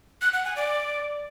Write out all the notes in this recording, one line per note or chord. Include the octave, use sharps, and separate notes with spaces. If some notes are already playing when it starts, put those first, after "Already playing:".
F#6
F#5
G#5
D5